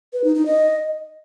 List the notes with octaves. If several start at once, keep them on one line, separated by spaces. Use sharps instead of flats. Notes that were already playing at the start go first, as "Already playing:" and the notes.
B4
D#4
D#4
D#5